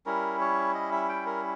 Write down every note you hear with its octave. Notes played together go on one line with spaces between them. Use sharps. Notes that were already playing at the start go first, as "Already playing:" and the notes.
G3 C#4 E4 A#4
C#5
D#5
E5
G5
A#4